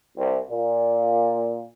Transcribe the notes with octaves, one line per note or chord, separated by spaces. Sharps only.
C2
A#2